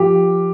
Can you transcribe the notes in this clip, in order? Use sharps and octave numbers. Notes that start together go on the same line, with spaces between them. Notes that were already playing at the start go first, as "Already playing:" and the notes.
Already playing: F3 G4